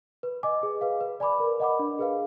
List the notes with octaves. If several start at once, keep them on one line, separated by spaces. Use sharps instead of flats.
B4
D#5 G#5 D6
G#4
B4 F5
B4
D5 G#5 B5 D6
A#4
D#5 F#5 B5 D6
D4
G#4 B4 F5